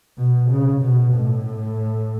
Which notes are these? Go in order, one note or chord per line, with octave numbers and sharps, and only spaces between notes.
B2
C#3
B2
A2